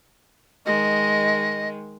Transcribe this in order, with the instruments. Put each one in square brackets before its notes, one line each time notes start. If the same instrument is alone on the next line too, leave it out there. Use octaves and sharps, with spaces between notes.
[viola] D#3 G#3 [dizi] D#5